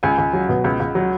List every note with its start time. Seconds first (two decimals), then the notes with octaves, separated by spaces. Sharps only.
0.03 C#2 G#5
0.18 C#2
0.33 F#3
0.49 B2
0.64 C#2
0.80 C#2
0.95 F#3